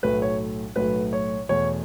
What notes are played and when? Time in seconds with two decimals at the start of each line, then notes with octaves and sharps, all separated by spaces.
0.03 B1 A2 F#3 A3 B4
0.22 C#5
0.76 B1 A2 F#3 A3 B4
1.13 C#5
1.49 E2 B2 A3 C#5